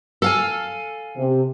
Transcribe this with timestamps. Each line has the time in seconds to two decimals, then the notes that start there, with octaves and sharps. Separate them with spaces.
0.22 A4 F5 G#5
1.17 C3